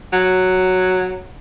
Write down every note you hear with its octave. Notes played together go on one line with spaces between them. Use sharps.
F#3